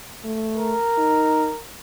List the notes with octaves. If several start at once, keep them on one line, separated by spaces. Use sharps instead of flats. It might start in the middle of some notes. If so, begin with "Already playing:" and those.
A3
A#4
D#4